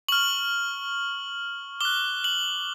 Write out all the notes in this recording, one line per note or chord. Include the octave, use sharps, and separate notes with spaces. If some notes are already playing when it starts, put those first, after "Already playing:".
C#6 F6 F#7
D6 F#6 G7
F#7